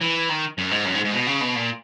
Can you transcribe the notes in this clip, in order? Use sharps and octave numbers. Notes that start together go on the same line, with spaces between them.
E3
D#3
F#2
G#2
F#2
G#2
G#2
B2
C#3
B2
A#2